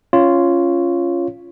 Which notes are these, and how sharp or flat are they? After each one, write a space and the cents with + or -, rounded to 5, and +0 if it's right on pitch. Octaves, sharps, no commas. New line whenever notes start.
C#4 +0 F4 -10 C#5 +0